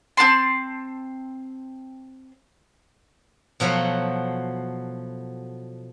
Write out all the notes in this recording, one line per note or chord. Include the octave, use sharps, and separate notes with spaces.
C4 F#4 A5 C6
B2 F3 F#3 A3 B3